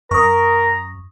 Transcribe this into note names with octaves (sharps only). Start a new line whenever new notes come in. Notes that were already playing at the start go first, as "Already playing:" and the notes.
F#2 A#4 A#5 C#6 D#6